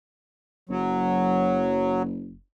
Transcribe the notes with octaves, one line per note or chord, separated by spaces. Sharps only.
F#1 F#3